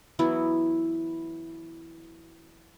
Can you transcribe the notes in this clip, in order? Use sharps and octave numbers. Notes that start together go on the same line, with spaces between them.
E3 F#3 B3 E4